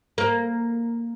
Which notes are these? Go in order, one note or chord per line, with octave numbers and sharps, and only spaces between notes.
A#3